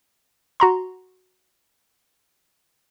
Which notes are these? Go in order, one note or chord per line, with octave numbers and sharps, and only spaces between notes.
F#4 A#5 C6